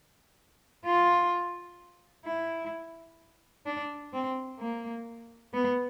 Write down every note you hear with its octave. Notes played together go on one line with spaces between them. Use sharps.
F4
E4
D4
C4
A#3
B3